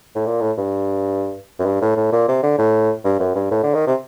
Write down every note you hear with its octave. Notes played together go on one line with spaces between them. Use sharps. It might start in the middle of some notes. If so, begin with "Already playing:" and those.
A2
A#2
A2
G2
F#2
G2
A2
A2
A#2
C3
D3
A2
G2
F#2
G2
A2
D3
D#3
C3